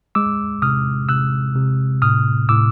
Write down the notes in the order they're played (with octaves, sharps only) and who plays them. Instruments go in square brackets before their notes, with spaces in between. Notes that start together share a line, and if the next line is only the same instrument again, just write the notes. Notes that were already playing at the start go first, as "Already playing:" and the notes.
[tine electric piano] G#3 D6 E6
C3 D#6 F6
C3 E6 F#6
C3
A2 D#6 F6
A2 D6 E6